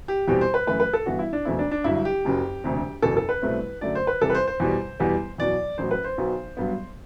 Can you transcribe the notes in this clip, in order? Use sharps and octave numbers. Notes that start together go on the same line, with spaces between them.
G4
E2 B2 G3 C4 G4
C5
B4
F#2 E3 A3 B4
B4
A4
G2 E3 B3 F#4
E4
D4
E1 E2 B2 A3 C4 E4
D4
D4
G1 G2 F#3 E4
G4
F#1 F#2 F#3
E1 D2 C3
F#1 E2 B2 A4
A4
B4
C2 B2 A3 C4
F#2 D3 F#3 A3 D5
C5
B4
E2 C3 G3 A4
B4
C5
C5
E2 B2 G3
E2 B2 G3 B3
E2 B2 F#3 D5
A1 A2 F#3 C5
B4
C5
B1 B2 F#3 B3
G2 F#3 B3